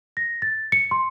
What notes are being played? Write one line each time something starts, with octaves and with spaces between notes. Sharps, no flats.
A#6
A6
C#7
C6